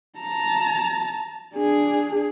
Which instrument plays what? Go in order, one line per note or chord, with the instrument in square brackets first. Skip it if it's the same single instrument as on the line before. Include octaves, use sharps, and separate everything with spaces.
[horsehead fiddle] A5 A#5
D4 G#4